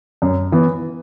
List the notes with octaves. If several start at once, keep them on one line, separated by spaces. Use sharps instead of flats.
F#2
E3 B3